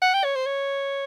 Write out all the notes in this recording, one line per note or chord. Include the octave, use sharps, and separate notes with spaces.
F#5
G5
C#5
C5
C#5